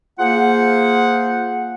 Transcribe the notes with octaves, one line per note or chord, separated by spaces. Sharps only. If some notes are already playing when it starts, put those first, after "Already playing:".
A#3 F4 G#4 C5 F#5